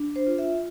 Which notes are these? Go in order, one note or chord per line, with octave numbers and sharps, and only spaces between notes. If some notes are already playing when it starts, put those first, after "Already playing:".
Already playing: D4
C5
F4
E5